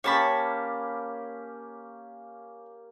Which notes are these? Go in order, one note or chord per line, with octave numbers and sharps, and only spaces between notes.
A#3 C#4 G4 C#5 A5 B5